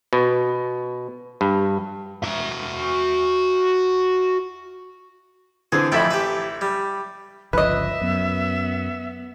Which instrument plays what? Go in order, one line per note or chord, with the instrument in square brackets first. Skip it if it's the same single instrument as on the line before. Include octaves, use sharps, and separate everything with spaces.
[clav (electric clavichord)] B2
G2
[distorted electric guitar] F#4 E5
[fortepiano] D3 E3 C4 [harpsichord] G#4
[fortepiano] A1 E5 B5 [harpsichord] F2 A4 G5
[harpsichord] G4 B4
G3
[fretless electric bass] G1 C#2 F3 [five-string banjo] B4 D#5 [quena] E5
[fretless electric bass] F#2 [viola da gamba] B3